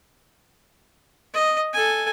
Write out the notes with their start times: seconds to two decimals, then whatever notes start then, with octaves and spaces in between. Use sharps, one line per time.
1.33 D#5
1.73 A4 G#5